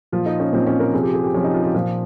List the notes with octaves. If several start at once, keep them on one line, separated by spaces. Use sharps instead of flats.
A#2 F3 F4
D#4
C#4
A#2 F3 C4
C#4
A#4
C3 F3 G#4
G4
G#4
G4
C3 F3 C#4
D#4
F4
G4
A#2 F3 F4